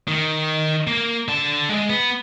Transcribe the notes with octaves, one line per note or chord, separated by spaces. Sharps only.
D#3
A#3
D3 A5
G#3
B3